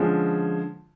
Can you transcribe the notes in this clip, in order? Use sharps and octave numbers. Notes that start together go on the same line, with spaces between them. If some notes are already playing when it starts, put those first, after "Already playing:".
Already playing: D3 F3 G#3 C#4